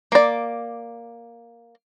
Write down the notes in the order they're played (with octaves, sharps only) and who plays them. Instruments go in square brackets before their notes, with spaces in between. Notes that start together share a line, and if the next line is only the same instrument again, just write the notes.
[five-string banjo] A#3 D5